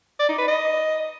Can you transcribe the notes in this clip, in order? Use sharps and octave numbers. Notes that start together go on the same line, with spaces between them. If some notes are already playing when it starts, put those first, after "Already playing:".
D5
D#4
B4
D#5